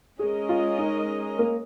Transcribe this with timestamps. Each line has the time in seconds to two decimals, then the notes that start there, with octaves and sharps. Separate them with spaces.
0.19 G#3 C#4 G#4 A#4 D#5
0.49 F4
0.79 D#4
1.39 A#3